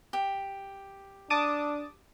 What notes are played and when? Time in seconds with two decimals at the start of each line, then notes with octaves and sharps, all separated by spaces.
0.13 G4
1.30 D4 A5 D6 D#6